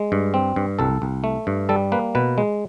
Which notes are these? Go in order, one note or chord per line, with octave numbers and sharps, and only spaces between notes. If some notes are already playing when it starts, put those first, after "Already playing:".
Already playing: G#3
G2
C4
G2
C2 A4
C2
A3
G2
G3 A4
A#3 B4
B2 B4
G#3